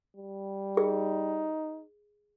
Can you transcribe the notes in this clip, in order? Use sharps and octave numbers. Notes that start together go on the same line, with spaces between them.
G3
D#4 G#4